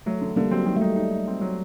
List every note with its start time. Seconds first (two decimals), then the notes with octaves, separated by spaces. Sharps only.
0.06 F#3 A3
0.21 D3
0.36 D3 G3 A#3
0.51 F#3 C4
0.66 D#3 F#3
0.76 A3
0.81 G3 D#4
0.96 D#4
1.11 D#4
1.27 C4
1.41 F#3